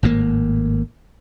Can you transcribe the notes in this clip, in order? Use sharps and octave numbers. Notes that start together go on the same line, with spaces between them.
G#1 A2 D#3 A#3